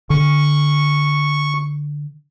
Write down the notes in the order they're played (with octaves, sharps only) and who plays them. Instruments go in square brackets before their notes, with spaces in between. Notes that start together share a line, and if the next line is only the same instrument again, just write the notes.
[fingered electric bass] D3 [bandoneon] C#6